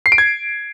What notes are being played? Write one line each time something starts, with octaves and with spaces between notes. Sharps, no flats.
C7
D7
G#6